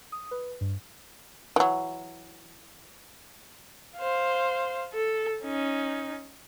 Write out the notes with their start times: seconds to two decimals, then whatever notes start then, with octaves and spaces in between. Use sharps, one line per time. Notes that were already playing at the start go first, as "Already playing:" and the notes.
0.12 D#6
0.31 B4
0.61 G2
1.56 E3 F#3
3.97 C5 F5
4.93 A4
5.43 C#4 D#4